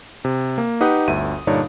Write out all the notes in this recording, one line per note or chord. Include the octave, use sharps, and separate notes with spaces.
C3
A#3
D#4 G4 B4 F#5 D#6
G1 D2 E5 D#7
G2 A#2 D3 D4 D#4 C#5